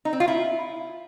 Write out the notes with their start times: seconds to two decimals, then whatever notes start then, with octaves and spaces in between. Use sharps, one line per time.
0.05 D#4
0.13 C4
0.20 F4
0.28 E4